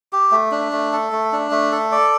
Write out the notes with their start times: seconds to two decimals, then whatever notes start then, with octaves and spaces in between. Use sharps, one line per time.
0.13 G4
0.32 A3
0.52 D4
0.72 A3
0.92 A4
1.12 A3
1.32 D4
1.51 A3
1.72 A4
1.92 D5